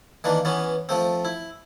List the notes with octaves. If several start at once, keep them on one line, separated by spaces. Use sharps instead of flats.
D#3 E3 A#3 D4
E3 B3 C#4
F3 A3 C4
E4